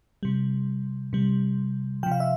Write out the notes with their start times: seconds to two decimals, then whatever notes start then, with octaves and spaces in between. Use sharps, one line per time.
0.23 C3 G3
1.13 C3 G3
2.03 C3 F3 G5
2.12 F5
2.20 E5